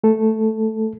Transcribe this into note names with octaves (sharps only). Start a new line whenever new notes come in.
A3 A4